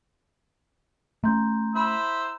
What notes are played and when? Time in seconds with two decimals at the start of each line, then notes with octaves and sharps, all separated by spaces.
1.24 A3 B3 C#4 A#5 C6 G6
1.75 E4 C5 B5 E6